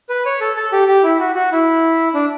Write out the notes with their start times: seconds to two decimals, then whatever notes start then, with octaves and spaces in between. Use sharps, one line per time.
0.09 B4
0.25 C#5
0.41 A4
0.56 A4
0.73 G4
0.88 G4
1.03 E4
1.20 F#4
1.35 F#4
1.52 E4
2.14 D4